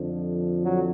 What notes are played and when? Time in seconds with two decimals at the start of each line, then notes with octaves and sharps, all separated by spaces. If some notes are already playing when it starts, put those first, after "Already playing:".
Already playing: F2 D3 F3
0.62 F#3